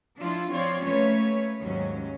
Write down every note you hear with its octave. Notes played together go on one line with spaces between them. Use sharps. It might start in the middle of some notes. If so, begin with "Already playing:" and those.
F3 D4 E4 F4
F3 C4 F4 C#5 D5
A3 A#3 C#4 B4 C#5
D#2 G#2 F#3 C#4